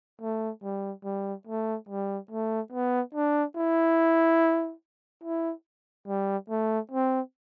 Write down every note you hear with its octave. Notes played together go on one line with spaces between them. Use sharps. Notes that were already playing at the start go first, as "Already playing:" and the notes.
A3
G3
G3
A3
G3
A3
B3
D4
E4
E4
G3
A3
C4